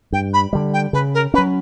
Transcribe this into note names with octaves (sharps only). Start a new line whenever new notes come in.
G2 G5
B5
D3 G3
G5
C#3 B4
A#4
F#3 C#4 B4